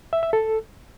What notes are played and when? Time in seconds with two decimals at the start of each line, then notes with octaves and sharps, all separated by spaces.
0.13 E5
0.23 E5
0.33 A4